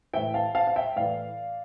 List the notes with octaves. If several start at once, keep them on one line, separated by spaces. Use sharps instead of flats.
A2 E3 E5 G5
F5 A5
F5 A5
F5
E5 G5
A2 E3 D5 F5